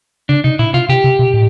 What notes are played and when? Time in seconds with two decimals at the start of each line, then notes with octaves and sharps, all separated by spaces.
0.29 C#3 D4
0.44 C3 D#4
0.59 A#2 E4
0.74 C3 F4
0.89 C3 G4
1.04 C3
1.19 B2
1.34 A2